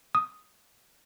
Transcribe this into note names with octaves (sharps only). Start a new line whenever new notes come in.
D#6